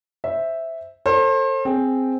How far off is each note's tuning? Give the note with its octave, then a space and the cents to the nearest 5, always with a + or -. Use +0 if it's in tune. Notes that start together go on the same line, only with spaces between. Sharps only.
C5 +0 E5 -5
A4 +35 C5 +35
C4 +0 G#4 +0 C5 +0